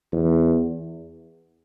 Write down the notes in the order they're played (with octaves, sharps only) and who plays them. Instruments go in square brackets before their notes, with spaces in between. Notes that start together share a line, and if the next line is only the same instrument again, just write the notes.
[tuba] E2